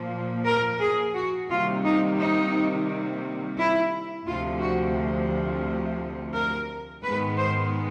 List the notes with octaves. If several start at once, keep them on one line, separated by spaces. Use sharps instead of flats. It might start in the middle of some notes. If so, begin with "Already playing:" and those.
Already playing: A#2 F3 A#3
A#4
G#4
F#4
C3 D#3 G3 A#3 F4
D#4
D#4
E4
D2 C3 F3 F4
F#4
A#4
G#2 D#3 G#3 B3 B4
C5